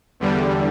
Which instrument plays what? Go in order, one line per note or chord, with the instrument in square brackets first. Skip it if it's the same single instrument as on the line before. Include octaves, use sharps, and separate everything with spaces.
[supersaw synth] E2 D3 G3